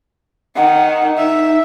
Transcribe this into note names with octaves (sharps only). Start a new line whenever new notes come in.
D#3 F#5
D#4 E5